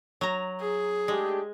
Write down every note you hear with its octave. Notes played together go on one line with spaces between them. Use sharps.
F#3 A#5
G#4
G#3 A3 D4 G4